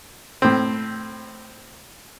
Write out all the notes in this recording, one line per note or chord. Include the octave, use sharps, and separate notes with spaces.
A2 C4